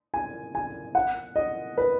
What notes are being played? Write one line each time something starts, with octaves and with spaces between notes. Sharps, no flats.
G#5
G#5
F#5
D#5
B4